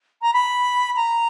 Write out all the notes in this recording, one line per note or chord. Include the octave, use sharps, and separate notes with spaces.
A#5
B5
A#5